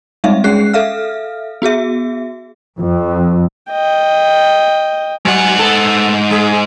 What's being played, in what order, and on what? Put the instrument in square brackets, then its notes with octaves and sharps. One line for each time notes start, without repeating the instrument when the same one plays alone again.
[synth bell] G3 G#3 C4 D#4 E5 F5
G#3 C#4 G#4 F#6 C7
A4 E5 F5 F6
B3 F#4 G#4 E5
[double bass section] F2
[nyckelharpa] D#5 G5
[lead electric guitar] G#2 F#5 [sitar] F#3
[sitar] B3 A4
G#3 G#4